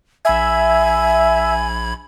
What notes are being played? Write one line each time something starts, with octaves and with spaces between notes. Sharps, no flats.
A#1 E5 G#5 B5 G#6